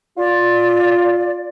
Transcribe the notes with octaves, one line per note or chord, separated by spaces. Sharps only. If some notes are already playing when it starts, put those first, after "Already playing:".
F4 D5